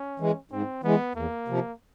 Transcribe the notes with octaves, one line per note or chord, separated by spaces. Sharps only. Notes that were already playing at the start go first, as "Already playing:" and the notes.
Already playing: C#4
E3 G#3
G#2 C4
E3 G#3 B3
E2 A#3
C3 F3